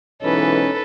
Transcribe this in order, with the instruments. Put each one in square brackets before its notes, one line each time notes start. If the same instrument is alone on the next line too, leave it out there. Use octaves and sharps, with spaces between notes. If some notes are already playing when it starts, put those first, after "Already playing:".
[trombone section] B1 G#2 E3 [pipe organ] C#4 D#4 [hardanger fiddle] A4 B4